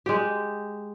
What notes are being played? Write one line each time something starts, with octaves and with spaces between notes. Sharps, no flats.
G#3 G4